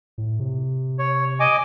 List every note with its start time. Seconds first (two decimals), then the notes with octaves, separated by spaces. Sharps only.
0.18 A2
0.40 C3
0.99 C#5
1.40 D#5 G#5 D6